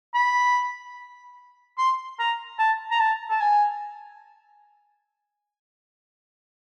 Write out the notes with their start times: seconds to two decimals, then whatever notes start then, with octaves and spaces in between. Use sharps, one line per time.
0.15 B5
1.78 C6
2.19 A#5
2.59 A5
2.91 A#5
3.00 A5
3.30 A5
3.41 G#5